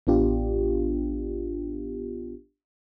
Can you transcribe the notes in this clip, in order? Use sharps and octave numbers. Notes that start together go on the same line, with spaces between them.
A1 B3 D4 F4 G4